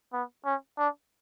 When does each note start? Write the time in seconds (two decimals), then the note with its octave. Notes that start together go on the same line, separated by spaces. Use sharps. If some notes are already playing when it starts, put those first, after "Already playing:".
0.13 B3
0.45 C#4
0.78 D4